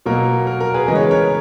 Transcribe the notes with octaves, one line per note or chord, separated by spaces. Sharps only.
B2 F#3 A#3 A#4
A#4
A#4
G#4 B4
C#3 E3 G#3 D#5
C#5
B4
A#4 C#5